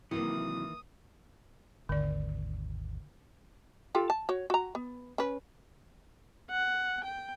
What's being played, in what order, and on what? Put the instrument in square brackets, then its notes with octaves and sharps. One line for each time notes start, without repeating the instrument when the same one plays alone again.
[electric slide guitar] C3 F#3 [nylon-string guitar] D#3 E3 A#3 [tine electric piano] E4 [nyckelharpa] D#6
[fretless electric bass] G#1 D#2 [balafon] D3 D5
[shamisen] F4 G4 A4
A5
F#4 C#5
F#4 A#5
B3
C#4 B4
[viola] F#5
G5